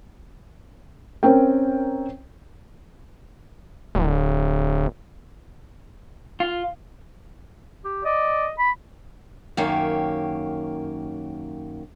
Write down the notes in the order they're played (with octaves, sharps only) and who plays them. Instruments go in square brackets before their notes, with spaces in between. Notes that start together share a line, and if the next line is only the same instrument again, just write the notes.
[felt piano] C4 C#4 A#4 G5
[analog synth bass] D1
[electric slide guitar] F4
[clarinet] G4
[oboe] D5 [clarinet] D#5
[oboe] B5
[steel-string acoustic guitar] F#2 D#3 A#3 G4 C#5